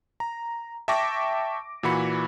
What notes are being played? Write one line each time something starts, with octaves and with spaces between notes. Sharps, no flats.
A#5
E5 G5 A5 C#6 D6 A#6
A#2 E3 F#4 B5 C#7